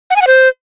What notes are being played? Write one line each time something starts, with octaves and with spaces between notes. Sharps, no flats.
F#5
G#5
F#5
C5